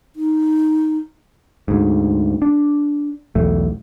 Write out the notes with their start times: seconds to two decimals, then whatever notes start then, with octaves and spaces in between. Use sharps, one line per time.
0.16 D#4
1.68 D2 G#2
2.42 D4
3.35 B1 E2 A3